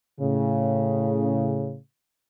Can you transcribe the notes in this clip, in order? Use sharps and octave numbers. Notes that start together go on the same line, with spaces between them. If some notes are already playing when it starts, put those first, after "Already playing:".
A2 C#3